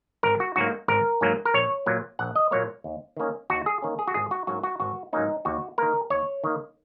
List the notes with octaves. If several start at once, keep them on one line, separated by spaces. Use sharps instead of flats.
G#1 A#4
F#4
G#2 F#3 A#3 F#4
G#1 A#4
G#2 F#3 A#3
A#4
A#1 C#5
A#2 F#3 A#3
A#1 F#5
D#5
A#2 F#3 A#3 C#5
D#2
D#3 A#3 C#4
D#2 F#4
G#4
D#3 A#3 C#4
G#4
F#4
G#1 G#4
F#4
G#2 F#3 A#3 C#4 F#4
F#4
G#1 F#4
G#2 F#3 A#3 C#4 D#4
D#2 F#4
D#3 A#3 A#4
D#2 C#5
D#3 A#3